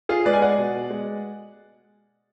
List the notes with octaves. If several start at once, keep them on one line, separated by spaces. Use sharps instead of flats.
F4 G#4
G#3 B4 D5
G#5
D5 F#5
B2
G#3